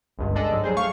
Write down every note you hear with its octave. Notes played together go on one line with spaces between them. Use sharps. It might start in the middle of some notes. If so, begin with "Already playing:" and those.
G1 C#2 G2
G#3 D4 A4 D5 D#5
G#2 F#3
F#3 G3 G#4 C5
A3 F5 C#6